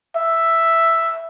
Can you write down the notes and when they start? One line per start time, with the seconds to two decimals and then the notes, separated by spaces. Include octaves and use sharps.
0.16 E5